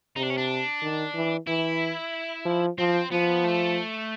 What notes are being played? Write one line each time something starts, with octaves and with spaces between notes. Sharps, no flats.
C3 D#4
D4
C#4
D4
D#3
E3
E3 E4
F3
F3 C4
F3 B3
A3